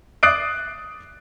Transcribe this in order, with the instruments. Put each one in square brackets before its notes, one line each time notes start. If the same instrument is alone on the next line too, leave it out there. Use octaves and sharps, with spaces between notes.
[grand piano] D6 D#6 F#6 A6 C7 D7